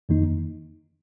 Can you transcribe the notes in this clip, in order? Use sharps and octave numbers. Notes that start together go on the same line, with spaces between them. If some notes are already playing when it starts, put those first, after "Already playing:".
F2 D#3 A#3 D#4